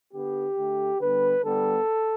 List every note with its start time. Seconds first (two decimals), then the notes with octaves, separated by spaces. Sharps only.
0.13 D3 B3 G4
0.57 D3 A3
1.00 D3 G3 B3 B4
1.43 D3 G3 B3 A4